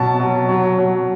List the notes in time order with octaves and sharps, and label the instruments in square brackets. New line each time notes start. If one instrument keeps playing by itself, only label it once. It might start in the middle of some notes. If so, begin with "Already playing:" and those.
Already playing: [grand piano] B2 F#3 A5
F#3
F#3
F#3